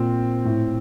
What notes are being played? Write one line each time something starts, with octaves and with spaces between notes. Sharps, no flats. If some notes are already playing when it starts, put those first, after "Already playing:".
Already playing: A#2 C4
A2